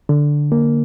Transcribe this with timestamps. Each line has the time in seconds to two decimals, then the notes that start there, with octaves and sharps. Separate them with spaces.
0.09 D3
0.52 A#3